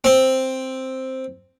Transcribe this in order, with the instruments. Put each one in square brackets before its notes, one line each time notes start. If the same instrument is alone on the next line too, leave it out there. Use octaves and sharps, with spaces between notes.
[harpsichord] C4